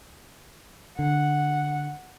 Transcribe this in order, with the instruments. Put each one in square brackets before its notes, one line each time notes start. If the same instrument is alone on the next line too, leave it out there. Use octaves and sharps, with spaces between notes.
[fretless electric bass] D3 [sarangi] F#5